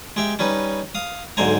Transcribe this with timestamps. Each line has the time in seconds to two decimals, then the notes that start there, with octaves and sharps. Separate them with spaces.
0.16 G#3 G4 E5
0.39 G3 C#4 D#4 B4
0.95 F5 D#6
1.37 B1 G#2 D3 C5 G#5 A#5